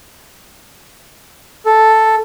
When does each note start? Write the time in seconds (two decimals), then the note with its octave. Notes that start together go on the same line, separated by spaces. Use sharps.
1.66 A4